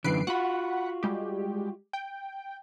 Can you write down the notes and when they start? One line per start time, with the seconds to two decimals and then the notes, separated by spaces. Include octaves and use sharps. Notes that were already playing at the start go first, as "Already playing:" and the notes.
0.04 F#2 D3 E3 B4 C7 D7
0.27 F4 F#4 F#5 B5
1.03 G3 G#3 G4
1.93 G5